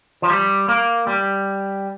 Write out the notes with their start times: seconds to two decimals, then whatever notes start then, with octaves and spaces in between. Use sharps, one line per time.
0.22 F3
0.30 G3
0.68 A#3
1.07 G3